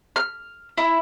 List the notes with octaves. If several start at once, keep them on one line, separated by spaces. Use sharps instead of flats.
F6
E4